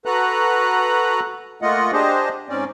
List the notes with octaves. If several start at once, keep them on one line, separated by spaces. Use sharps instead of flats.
F#4 A4 B4 A#5 F#6
A3 A#3 F4 D#5 F#5
D4 G4 G#4 C5 D#5
G#2 C4 C#4 D5